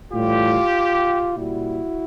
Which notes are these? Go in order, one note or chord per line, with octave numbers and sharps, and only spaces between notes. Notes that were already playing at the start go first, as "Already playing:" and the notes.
A2 E3 G3 F4 G4
A#2 G3 E4 F#4